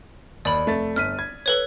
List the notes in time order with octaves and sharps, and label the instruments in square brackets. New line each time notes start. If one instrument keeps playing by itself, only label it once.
[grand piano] D#2 [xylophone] D5 B5
[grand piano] F1 A3 A6
[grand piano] G1 B6 D#7 [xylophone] F6
[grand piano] G#6
[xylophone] A4 B4 C#5